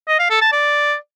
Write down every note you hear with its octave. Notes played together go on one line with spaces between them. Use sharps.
D#5
F5
A4
A5
D5